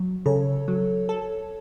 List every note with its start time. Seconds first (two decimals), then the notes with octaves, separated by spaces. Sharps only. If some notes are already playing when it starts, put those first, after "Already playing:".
Already playing: F#3
0.26 C#3 A4 C#5
0.68 F#3
1.09 A4